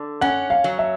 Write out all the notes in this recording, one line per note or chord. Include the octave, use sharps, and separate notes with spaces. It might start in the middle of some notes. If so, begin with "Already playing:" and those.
Already playing: D3
C#4 F#5
F5
F#3
E5